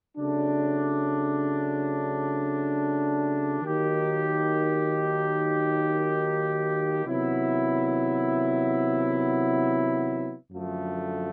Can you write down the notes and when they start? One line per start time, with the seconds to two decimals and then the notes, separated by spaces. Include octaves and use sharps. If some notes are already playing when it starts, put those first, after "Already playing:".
0.17 C#3 F#3 A3 D4
3.62 D#3 F#3 A#3 D#4 G4
7.06 C3 D#3 F#3 B3 E4
10.51 F#2 D3 F3 A3